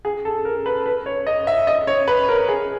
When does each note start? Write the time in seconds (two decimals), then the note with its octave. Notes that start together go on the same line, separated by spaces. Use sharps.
0.05 G#4
0.25 A4
0.45 A#4
0.66 B4
0.86 B4
1.06 C#5
1.27 D#5
1.47 E5
1.67 D#5
1.87 C#5
2.08 B4
2.29 A#4
2.48 G#4